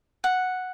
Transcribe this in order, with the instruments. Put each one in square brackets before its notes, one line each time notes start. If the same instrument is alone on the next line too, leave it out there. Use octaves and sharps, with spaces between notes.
[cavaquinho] F#5